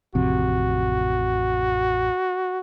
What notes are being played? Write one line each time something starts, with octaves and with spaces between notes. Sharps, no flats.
A1 F2 C3 F#4